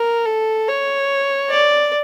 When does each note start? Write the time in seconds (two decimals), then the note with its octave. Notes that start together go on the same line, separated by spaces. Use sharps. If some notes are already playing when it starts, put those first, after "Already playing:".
Already playing: A#4
0.26 A4
0.68 C#5
1.50 D5